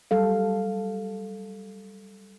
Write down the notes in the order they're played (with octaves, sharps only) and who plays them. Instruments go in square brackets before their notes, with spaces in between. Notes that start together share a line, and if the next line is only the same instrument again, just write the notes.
[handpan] F#3 G3 A4 F5